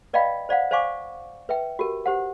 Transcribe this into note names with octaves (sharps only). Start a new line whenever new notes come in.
B4 D5 D#5 F5 G5 B5
C5 D5 F5 F#5
C5 D5 F5 G#5 C#6 D6
B4 E5 G5
F#4 G4 A#4
G4 C5 F#5